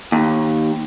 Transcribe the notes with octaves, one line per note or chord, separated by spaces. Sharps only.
D#2